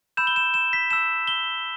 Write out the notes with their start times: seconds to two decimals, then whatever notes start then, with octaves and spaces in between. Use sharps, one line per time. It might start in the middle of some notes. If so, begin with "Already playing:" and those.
0.17 B5 E6 G6 E7
0.27 G7
0.36 E7
0.54 E7
0.73 B6
0.90 A5 E6 G6 E7
1.27 G7